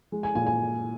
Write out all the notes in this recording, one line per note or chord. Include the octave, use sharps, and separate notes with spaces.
G#3
G#5
A#2 G#5
G#5